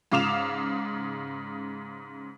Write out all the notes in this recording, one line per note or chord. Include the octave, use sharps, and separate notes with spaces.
G#2 C#3 F5 D6 E7 F7